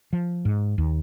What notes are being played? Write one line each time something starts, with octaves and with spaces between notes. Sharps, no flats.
F3
G#2
D#2